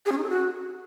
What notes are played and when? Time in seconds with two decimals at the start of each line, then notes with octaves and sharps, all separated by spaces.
0.06 G#4
0.12 C#4
0.17 D#4
0.23 A4
0.29 F#4